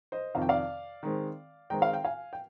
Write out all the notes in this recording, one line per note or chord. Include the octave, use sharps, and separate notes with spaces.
C5 D#5
F2 C3 D#3 F5
G5
D5 F5
D#3 G#3 C4
D#3 G#3 C4 G5 A#5
F5
G5
F5 G#5
G5